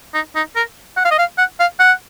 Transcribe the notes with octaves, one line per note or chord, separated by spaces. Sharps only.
D#4
D#4
A#4
F#5
F5
D#5
F5
F#5
F5
F#5